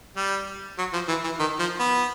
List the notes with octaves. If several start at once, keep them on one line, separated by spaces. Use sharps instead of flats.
G3
F#3
F3
E3
E3
D#3
F3
B3